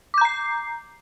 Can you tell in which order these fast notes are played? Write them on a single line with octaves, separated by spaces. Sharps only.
D6 G6 A#5 C7